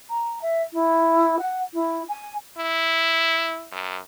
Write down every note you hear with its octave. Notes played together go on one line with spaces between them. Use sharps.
A#5
E5
E4
F#5
E4
G#5
E4
F#2